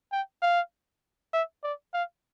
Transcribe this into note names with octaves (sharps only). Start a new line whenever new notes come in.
G5
F5
E5
D5
F5